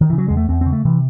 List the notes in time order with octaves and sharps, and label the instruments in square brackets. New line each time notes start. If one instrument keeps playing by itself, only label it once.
[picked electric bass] D#3
E3
C#3
F#3
E2 G#3
A3
E2 C4
C4
C#3
A3
C3 E3